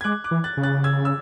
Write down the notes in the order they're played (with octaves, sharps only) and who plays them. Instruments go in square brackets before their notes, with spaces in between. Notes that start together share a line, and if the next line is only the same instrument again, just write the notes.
[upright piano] G#6
[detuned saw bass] G#3 [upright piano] D6 F#6
[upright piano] D6 F#6
[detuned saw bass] E3
[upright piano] F#6 A6
[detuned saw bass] C#3
[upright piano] F#6 A6
E6 G#6
E6